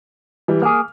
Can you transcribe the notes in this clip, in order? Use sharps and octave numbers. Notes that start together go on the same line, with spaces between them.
E3 G3
A#3 G#4 F6